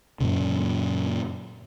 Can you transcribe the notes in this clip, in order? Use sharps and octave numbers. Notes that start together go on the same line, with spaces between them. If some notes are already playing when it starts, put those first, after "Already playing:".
F#2 A#2 C#3